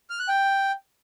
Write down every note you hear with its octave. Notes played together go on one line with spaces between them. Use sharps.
F6
F#6
G5